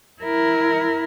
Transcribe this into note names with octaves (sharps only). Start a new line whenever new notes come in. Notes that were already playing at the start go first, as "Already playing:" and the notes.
E4 A#4